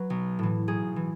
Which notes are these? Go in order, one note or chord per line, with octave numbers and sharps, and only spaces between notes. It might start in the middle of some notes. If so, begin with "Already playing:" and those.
Already playing: F#3 B4
B1
A2 E3
B1 G#4
E3